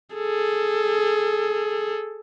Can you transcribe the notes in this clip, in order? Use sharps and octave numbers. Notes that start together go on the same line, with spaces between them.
G#4 A4